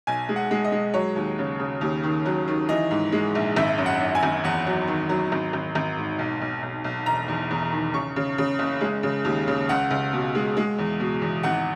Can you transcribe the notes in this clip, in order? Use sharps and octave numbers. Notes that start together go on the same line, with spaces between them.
B1 G#5
G#3
F#5
G#3
D#5
G#3
F#3 C#5
D#2
C#3
C#3
D#2
D#3
F#3
D#3
E3 D#5
G#2
G#3
A#1
G#1 E5
F#2
F#5
F#2
G#5
G#1
E2 F#5
F#3
D#3
F#3
G#1
G#1
G#1
G#2
B1
B1
B1
B1
E1 A#5
E2
E2
D#3
C#3 C#6
C#3
C#3
F#1
G#3
C#3
D#2
C#3
C#2 F#5
C#2
B2
G#3
G#3
E2
B2
E2
G#1 F#5